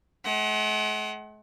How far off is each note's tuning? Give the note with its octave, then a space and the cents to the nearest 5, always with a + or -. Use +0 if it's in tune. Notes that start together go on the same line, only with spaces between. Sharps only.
G#3 +45 F#5 +35